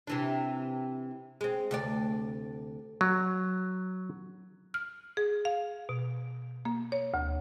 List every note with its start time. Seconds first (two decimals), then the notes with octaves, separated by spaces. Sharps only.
0.07 C3 E3 D4
1.41 G#3 C4
1.71 D2 C3 D5
3.01 F#3
4.74 F6
5.17 G#4
5.45 F5
5.89 B2
6.65 A#3
6.92 C#5
7.14 D2